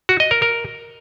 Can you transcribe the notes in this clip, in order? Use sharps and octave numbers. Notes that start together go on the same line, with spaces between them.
F#4
D#5
A#4
A#4